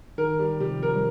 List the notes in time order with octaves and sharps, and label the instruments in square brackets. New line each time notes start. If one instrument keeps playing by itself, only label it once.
[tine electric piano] D#3 [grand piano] A#4
[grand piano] G3
[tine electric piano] C3 F3 [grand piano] G3
[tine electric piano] F3 [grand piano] A#4
[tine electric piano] G3